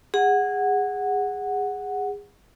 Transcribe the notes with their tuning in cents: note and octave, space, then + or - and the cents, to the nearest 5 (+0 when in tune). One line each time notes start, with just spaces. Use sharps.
G#4 -20 F#5 +0